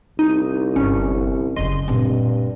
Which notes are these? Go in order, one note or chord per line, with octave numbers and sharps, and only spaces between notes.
C2 D#4
G1 C#4
F#1 C#3 D#5 C6
G2 A#2 C4